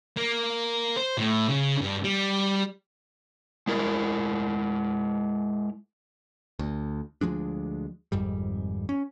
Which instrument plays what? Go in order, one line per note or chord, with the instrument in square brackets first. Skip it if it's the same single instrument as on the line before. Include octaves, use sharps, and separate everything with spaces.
[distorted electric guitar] A#3
C5
A2
C#3
G2
G3
[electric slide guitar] G#3 E4 A#4
[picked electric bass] D2
D2 F3 G#3 D4
G#1 F2 G#2 G3
C#4